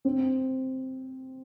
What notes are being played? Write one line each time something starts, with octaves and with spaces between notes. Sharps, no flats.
C4